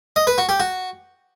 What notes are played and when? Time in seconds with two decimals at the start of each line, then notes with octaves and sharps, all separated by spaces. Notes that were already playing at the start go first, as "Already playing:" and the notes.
0.16 D#5
0.27 B4
0.38 F#4
0.49 G4
0.60 F#4